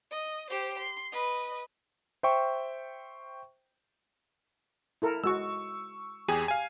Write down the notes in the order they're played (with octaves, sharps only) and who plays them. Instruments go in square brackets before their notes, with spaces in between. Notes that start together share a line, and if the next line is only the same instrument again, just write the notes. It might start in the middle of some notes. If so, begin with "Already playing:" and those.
[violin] D#5
G4 C5
C6
B4 D#5
[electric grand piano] C5 E5 G5 C#6
[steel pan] E4 A4 A#4
[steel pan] G#3 F#4 [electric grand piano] C#6 E6
[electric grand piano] E2 G#4 G#5 [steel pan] G4
[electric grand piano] F5 G#5